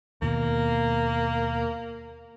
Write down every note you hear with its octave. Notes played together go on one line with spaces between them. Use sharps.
D#2 B2 A#3